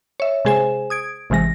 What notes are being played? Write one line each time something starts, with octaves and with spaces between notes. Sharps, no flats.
C#5 E5
C3 G#3 G#4 C5 G#5 E7
D#6 G#6 D7
A1 C3 E3 G#3 A#6